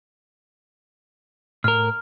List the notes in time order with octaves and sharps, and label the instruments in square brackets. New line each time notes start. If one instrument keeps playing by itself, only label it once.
[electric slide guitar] A2 A#4 [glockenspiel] F6